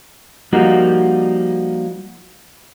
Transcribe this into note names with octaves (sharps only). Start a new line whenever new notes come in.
F3 G3 A#3 D#4 F#4